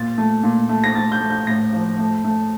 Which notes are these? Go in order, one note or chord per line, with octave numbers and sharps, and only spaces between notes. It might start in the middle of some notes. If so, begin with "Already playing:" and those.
Already playing: A#2 A6
A3
A#2
A3
A#6
A3 A6
G6
A3
G6
A2 A#6
F3
A3
A3